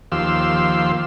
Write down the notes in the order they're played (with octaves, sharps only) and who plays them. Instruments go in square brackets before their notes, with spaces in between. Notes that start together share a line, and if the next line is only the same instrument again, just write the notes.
[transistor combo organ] D#2 F3 G4 F5 C6 E6